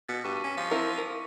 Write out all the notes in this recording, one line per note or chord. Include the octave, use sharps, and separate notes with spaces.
B2 A6 B6 C#7
G2 C#6 D6 D#7
C#4
F3
C4 E4 A#4
A#4